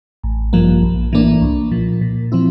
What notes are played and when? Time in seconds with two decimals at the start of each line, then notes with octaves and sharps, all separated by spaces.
0.24 A1
0.53 G2 F3 A#3
0.83 A#1
1.12 A2 E3 A#3 D4
1.42 C2
1.72 A#2 F3
2.01 A#2
2.32 F3 C4 E4